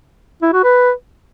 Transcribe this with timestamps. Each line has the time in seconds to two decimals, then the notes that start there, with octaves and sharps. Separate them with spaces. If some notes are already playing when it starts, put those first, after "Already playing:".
0.42 E4
0.53 F#4
0.63 B4